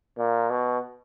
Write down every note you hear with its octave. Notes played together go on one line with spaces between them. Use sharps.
A#2
B2